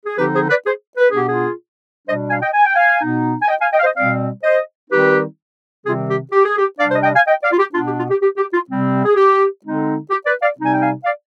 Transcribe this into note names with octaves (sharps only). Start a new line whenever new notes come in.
G#4
D3 F3 C4 D#4 G4 B4
G#4 C5
B4 D5
G#4 C5
B4
G#4
B2 B3 D4 G4
F4 G#4
B2 G3 D4 C5 D#5
F5 G#5
D#5 G5
G#5
G5
F5 G#5
B2 B3 D#4
G#5
D#5 G5
F5 G#5
D#5 G5
F5
C5 D#5
B2 G3 C4 D5 F5
C5 D#5
D#3 G3 C4 D#4 G4 B4
C3 D#3 G3 C4 F4 G#4
G4
G4
G#4
G4
C3 G3 D4 D5 F5
C5 D#5
D#5 G5
F5 G#5
D#5 G5
D5 F5
F4
G4
B2 B3 D4 F4
G4
F4
G4
G4
G4
F4
C3 G3 C4
G#4
G4
D3 G#3 C4 D#4
G4
B4 D5
D5 F5
C3 G3 C4 D#4
G#5
G5
F5 G#5
D5 F5